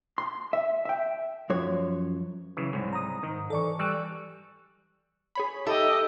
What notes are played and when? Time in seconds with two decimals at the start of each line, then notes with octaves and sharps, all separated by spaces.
0.18 C6
0.53 E5
0.85 E5 G5
1.50 F#2 F3 C#5
2.57 C#3 E3 F#3
2.73 C2 G#2
2.93 A#5 D#6
3.23 G#2 D#3
3.50 E3 A4 D5 C#6
3.79 G3 C#6 E6 F#6
5.35 G#4 C#5 B5
5.66 D#4 G4 A4 D#5 E5